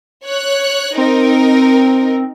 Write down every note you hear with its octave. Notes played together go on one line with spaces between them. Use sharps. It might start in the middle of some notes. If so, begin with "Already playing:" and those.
C#5 F#6
C4 D#4 A#4